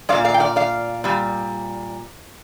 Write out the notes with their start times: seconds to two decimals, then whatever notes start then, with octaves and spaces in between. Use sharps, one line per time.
0.09 A#2 G#3 D5 F5
0.25 D5 F5
0.34 G5
0.40 D5 F5
0.56 D5 F5
1.04 A#2 G3